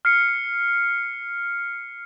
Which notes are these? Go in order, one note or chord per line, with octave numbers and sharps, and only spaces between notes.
F6 C7 C#7